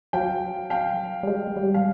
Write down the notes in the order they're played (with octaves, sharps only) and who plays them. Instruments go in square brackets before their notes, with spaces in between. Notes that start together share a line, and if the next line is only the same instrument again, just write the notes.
[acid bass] F#3 [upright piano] F5 G5
[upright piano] F5 G5
[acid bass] G3
G#3
G3
[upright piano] F5